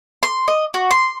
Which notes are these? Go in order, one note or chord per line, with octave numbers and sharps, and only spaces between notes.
C6
D#5
F#4
C6